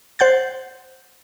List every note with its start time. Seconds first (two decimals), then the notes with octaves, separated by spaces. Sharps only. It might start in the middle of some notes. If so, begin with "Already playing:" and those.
0.19 C5 F#5 G6 A6